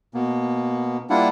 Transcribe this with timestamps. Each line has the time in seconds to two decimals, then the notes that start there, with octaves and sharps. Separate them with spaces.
0.14 B2 A#3 B3
1.10 G3 A#3 D4 E4 F4 F#5